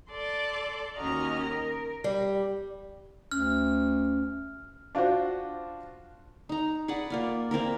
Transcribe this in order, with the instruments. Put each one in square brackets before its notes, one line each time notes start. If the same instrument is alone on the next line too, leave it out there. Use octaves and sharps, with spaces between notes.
[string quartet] A4 D5 C6 D6
D#2 C#4 F#4 D#5 A#5 F6
A#4
[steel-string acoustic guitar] G3
[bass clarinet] D2 [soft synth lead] C#4 [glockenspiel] F6
[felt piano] D4 F4 F#4 C5
[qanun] D#4 A#5
G#4 B4 D5 F#5
A#3 F4 D5
A#3 C4 E4 A#4